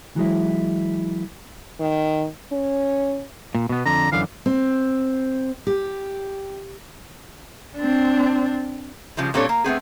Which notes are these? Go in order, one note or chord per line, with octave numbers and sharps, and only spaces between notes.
E3 F#3 G#3 E4
D#3
C#4
A#2
B2 B3
F2 D3 A#5
F#2 D3 E3 F5
C4
G4
C4 D4
C#3 F3 G3 G#3
A#2 G3 C4 D4 A4 C#5
A#3
A3 B3 C4 G#4